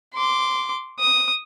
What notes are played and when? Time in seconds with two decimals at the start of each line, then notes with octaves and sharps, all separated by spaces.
0.14 C6 D6
0.99 D#6